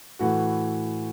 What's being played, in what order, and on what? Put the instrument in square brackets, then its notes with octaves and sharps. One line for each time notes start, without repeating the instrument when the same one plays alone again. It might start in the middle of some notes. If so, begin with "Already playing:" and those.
[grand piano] A2 E3 A3 F#4